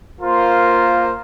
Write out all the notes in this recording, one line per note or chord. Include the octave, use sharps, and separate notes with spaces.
A#3 F4 A#4 C5